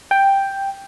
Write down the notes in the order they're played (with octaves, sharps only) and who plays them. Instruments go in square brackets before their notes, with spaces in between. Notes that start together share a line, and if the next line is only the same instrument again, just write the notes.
[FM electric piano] G5